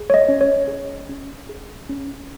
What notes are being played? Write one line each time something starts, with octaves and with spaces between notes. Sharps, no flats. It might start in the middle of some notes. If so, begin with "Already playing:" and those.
Already playing: G#4
C#5
D#5
C#4
C#5
G#4
C#4
G#4
C#4